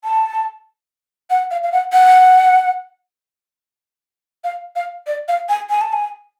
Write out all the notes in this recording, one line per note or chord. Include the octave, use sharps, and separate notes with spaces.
A5
F#5
F5
F5
F#5
F#5
F5
F5
D5
F5
G#5
G#5
A5
G#5